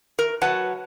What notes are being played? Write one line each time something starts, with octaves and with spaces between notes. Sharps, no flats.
A#4
F#3 B4 F#5 A5